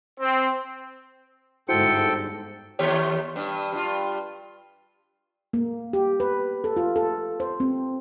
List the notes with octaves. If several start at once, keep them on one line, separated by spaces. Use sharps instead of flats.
C4
G1 G#2 E4 F#4 A4 C5 G5 C#7
D#2 G4 C#5
G2
G2 F4
A#3
G4
B4
A4
F4
A4
C5
C4